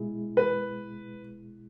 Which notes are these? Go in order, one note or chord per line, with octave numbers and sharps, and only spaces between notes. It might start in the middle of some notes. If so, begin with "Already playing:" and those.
Already playing: B2 G#3 E4 G#4
B4